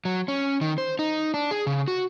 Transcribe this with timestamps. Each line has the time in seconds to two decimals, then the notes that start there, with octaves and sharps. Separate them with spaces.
0.05 F#3
0.28 C#4
0.61 D#3
0.78 C5
0.99 D#4
1.34 D4
1.51 G#4
1.67 C#3
1.88 F#4